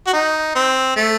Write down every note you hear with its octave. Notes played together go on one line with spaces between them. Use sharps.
F#4
D#4
C4
A3